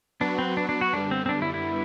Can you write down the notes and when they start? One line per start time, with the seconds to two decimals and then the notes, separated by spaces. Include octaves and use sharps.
0.20 F#3 B3 D4 F#4 B4
0.38 C4
0.57 D4
0.69 D4
0.81 F#4
0.93 F#2 D3 G3 B3 D4
1.11 C4
1.26 C4
1.29 D4
1.42 E4
1.54 E4